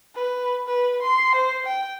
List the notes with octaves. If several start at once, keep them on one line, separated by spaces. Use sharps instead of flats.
B4
B4
C6
C5
G5